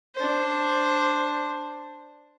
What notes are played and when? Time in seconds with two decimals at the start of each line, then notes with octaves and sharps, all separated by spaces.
0.16 D4 C5